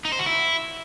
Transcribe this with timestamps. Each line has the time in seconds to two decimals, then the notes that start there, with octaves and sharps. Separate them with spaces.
0.05 D#4
0.12 C5
0.19 F#4
0.26 E4